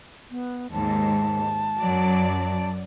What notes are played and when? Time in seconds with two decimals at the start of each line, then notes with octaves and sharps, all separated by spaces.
0.31 B3
0.72 D#2 G#2 A5
1.80 F#2 F#3 D5